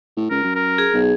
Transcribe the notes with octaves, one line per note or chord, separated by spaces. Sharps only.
A2
C#2 A#4
F#2
A#4
G#4
B1